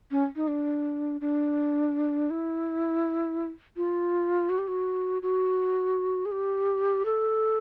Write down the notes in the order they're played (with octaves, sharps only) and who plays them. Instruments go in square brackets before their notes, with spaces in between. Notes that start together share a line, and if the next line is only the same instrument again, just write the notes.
[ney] C#4
D#4
D4
D4
E4
F4
F#4
G4
F#4
F#4
G#4
G4
A4